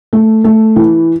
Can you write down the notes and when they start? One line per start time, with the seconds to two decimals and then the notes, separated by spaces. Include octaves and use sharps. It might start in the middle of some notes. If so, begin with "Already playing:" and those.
0.13 A3
0.44 A3
0.76 E3